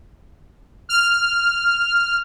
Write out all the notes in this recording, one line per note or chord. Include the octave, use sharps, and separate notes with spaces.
F6